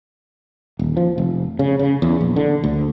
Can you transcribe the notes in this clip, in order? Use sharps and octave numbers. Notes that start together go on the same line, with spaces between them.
D#1
F3
F1
C#3
C#3
E2
A#1
D3
D2